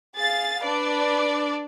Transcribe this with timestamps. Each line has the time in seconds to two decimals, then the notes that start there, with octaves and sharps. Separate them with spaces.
0.16 G#4 F5 A6
0.64 D4 B4 D5